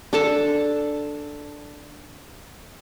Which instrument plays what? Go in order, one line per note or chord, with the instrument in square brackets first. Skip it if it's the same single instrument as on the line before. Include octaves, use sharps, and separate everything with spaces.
[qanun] D4 A4 A5